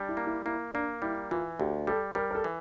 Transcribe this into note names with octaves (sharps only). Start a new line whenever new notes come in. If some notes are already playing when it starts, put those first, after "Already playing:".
Already playing: G3 D4
E4
A#3
E4
A#3 E4
A#3 D4
G3 E4
E3 F4
D2 G4
G3 A4
G3 A#4
A#4
A4
E3